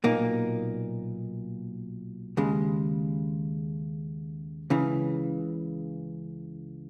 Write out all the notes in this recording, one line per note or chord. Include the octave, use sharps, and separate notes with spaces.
B1 A#2 A#3 D#4
D#2 C#3 G#3
C#2 C#3 E3